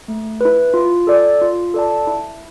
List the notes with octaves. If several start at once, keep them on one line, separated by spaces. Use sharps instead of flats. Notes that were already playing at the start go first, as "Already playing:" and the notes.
A3
E4 B4
F4
A4 D5
F4
A4 D5 A5
E4